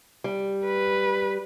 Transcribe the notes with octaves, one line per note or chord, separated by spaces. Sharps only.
G3
B4